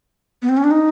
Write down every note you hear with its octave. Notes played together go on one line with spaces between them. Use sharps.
B3
C4
C#4
D4
D#4